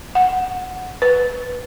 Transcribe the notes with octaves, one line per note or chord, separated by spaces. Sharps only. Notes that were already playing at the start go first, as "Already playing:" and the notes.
F#5
B4